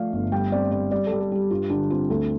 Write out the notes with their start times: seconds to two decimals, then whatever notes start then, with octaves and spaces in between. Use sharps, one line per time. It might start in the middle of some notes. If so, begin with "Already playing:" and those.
Already playing: F3 A3 D5 F5
0.13 G1
0.32 G3 G5
0.52 C4 D5
0.71 G3 D5
0.91 G3 D5
1.07 A4
1.12 G3
1.21 A4
1.32 G3 G4
1.50 G2 F4
1.70 D3 D4
1.90 C4 F4
2.10 D2 A4